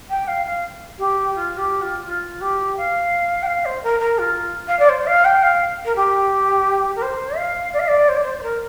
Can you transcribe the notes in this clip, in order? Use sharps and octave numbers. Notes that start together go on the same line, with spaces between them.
G5
F5
F5
G4
F4
G4
F4
F4
G4
F5
G5
F5
C5
A#4
A#4
F4
F5
D5
C5
F5
G5
F5
A#4
G4
A#4
C5
F5
D5
F5
D5
C5
D5
C5
C5
A#4